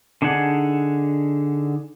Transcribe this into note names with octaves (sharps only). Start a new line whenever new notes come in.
D3 D4 D#4 G#4 F#5